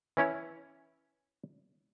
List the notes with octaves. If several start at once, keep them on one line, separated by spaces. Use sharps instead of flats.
E3 C#4 E4 C#5